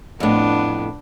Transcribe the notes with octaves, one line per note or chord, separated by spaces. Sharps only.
F2 A2 B3 D4